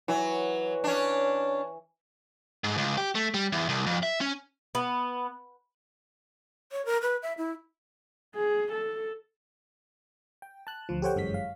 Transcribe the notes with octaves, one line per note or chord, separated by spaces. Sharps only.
E3 F#3
C#4 D4
G#2
C#2
G4
A3
G3
E2
C2
F2
E5
C#4
B3
C#5
A#4
B4
E5
E4
G#4
A4
G5
A5 F#6
D2 F3
G4 A4 C5 C#5 F#5 G5
G1 F#2 E3 G#3 C#5 B6
F5